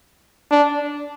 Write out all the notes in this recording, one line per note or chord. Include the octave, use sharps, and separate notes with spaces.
D4